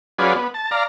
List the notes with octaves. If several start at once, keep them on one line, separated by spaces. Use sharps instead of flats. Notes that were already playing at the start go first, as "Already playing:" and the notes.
F#3 C#4 F4 G#4 B4 D5
B3
A5
D5 F5 A#5